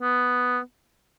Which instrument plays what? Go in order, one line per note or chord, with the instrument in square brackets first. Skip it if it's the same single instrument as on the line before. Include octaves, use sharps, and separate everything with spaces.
[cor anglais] B3